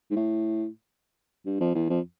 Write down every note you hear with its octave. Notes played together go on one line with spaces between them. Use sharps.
G#2
A2
G2
F2
E2
F2